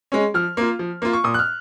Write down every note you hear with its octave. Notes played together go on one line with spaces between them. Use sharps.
G#3 C#4
F3 F6
A#3 F4
F3
A#3 F4
C#6
A#2 D#6
F#6
F6